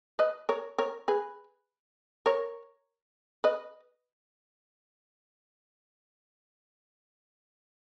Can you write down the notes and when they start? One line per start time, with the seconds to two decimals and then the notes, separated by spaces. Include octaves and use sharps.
0.19 B4 D#5
0.49 A#4 C#5
0.78 A#4 C#5
1.08 G#4 B4
2.26 A#4 C#5
3.44 B4 D#5